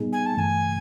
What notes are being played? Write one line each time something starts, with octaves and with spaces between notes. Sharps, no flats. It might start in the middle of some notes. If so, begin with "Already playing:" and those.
Already playing: A#2 G3 B3 D#4 G#4
G#5
A5
G2 E3 A3 G#5